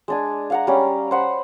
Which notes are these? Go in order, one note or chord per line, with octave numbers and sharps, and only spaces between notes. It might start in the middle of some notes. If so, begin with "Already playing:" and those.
G#3 D4 G#5
F5 F#5 A#5
G3 C#4
C5 F#5 B5